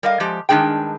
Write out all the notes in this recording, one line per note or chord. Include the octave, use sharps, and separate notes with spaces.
G3 A#4 D#5 F5
F3 G#3 G4
G2 D#3 G#3 D4 G#4 G5